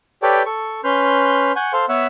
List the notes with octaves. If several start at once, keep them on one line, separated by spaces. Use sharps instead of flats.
G4 A4 B4 C#5 D5 G5
A4 C#6
C#4 B4 C6 F6 G6
F#5 G#5 C#6 G6
A4 C5 F5 C6
B3 B4 C#5 E5 F#5 E6